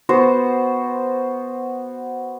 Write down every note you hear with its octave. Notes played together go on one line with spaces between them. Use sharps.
B3 F#4 C5